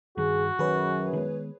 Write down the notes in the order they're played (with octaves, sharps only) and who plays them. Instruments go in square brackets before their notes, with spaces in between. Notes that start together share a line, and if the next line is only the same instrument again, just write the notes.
[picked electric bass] G2 D#3 [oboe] F#4 [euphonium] G#4
[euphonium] F#2 [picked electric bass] D#3 F#3 [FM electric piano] G#4 B4 C#5
[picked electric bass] D#3 G#3 B3